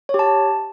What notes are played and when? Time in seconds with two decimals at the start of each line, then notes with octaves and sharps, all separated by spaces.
0.09 C#5
0.14 G4
0.19 A5